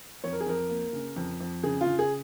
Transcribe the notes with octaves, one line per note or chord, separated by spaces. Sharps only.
F2 C#5
A#4
G#4
F2 A#4
A#3
C#3
F2
F2
C#3 G#4
F4
C#3
G#4